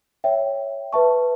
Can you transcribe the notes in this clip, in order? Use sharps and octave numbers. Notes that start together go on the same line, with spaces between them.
C#5 E5 G5
B4 E5 A5 C#6